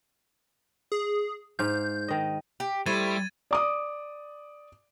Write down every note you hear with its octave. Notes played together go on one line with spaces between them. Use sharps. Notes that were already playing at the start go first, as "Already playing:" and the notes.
G#4
G#2 F5 G6
D#3 D#5
G4
G3 A3 E4 C5 G#6 A6 D#7
D5 D6 D#6